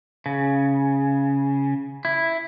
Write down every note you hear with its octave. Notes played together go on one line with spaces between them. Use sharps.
C#3
E4